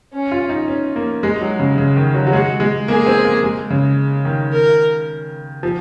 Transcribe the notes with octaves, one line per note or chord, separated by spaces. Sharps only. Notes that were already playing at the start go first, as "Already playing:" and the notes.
C#4
F4
D#4
C#4
A#3
G#3 D#4
F#3
C#3
C#3
D#3
F#3
F#3
G#3 F#4
G#3
A#3 G#4
C4
A#3
G#3
C#3
D#3
A#4
F3